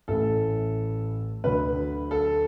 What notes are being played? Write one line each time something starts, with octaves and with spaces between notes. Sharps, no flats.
A1 A2 E3 A4
D2 D3 F#3 B4
A4